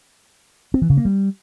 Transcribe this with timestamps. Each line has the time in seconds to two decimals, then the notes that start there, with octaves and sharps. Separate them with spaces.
0.74 C4
0.82 E3
0.90 C#3
0.97 A#3
1.05 G3